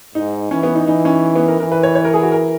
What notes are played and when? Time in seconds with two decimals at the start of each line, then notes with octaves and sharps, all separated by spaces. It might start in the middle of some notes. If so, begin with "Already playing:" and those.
0.15 G#2 D#4
0.51 E3 C#4
0.63 B3
0.75 D#4
0.87 E3 D#4
1.05 C#4
1.35 B3
1.48 A#4
1.60 E3 A#4
1.72 B4
1.83 C#5
1.95 C#5
2.05 A#4
2.14 G#4
2.23 F#4
2.32 A#4